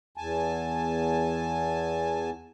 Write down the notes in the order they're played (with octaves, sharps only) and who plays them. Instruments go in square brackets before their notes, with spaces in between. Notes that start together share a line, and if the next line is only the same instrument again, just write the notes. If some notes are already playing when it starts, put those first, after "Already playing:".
[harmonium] E2 G#5 A5